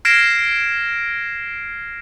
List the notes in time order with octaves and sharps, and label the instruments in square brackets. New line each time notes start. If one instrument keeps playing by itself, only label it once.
[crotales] F6 G#6 A#6 C7 D7 E7